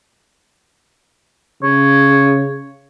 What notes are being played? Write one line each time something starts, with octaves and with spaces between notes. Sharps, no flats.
C#3 C#5